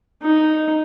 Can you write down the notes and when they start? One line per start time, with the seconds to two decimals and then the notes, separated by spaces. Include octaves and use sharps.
0.23 D#4